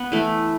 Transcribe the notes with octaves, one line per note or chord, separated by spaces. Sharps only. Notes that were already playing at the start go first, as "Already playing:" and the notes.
Already playing: B3
E3 A3